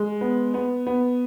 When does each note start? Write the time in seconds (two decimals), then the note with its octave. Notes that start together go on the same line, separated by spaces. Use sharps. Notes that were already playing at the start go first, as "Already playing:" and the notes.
Already playing: G#3
0.21 B3
0.54 B3
0.87 B3